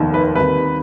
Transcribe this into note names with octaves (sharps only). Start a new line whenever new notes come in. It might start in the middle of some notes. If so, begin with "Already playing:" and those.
Already playing: F1 D#2 D#3 B3
B4
D#2 D#3 G3 C4 B4